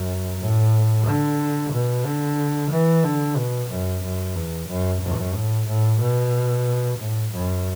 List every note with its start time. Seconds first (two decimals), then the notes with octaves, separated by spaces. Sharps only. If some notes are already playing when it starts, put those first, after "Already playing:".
Already playing: F#2
0.41 A2
1.07 D3
1.73 B2
2.05 D3
2.72 E3
3.04 D3
3.37 B2
3.70 F#2
4.04 F#2
4.36 E2
4.69 F#2
5.01 F#2
5.34 A2
5.68 A2
6.01 B2
6.99 A2
7.32 F#2